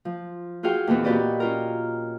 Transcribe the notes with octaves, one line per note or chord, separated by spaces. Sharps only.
F3
F4 F#4 G#4 F5 G5
D#2 A#2 E3 B3 C4
A#2 F#4 G4 B4 D5 D#5
C#4 F4 A#4